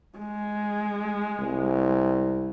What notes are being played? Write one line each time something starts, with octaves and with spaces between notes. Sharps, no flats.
G#3
C2